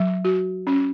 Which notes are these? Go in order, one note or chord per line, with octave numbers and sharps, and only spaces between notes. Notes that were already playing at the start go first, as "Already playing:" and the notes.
Already playing: F#3
F#4
C#4